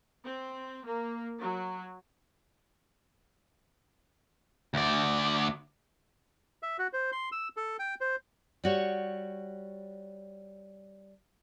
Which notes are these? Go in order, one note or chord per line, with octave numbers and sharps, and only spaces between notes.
C4
A#3
F#3
D2 D5
E5
F#4
C5
C6
E6
A4
G5
C5
G3 F#4 C#5